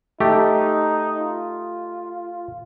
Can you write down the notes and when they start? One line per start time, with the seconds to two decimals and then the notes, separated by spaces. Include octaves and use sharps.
0.20 A3 D#4 G4
1.20 F4